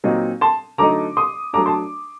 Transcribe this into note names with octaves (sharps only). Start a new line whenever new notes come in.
A#2 F#3 C4 D#4
A5 C6
D3 F#3 A3 D#4 A#5 D6
C6 D#6
F#3 A3 D4 A#5 D6
A5 C6